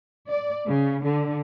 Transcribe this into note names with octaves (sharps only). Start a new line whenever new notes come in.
D5
C#3
D3